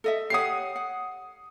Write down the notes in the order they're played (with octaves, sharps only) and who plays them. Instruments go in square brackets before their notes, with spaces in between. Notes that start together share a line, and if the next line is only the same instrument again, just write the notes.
[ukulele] A4 D#5 E5
[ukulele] G4 C#5 F#5 [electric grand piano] D#6 C7
[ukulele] F#5